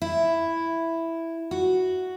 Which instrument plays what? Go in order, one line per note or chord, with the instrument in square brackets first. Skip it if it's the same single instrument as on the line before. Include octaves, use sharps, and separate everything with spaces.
[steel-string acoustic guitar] E4
F#4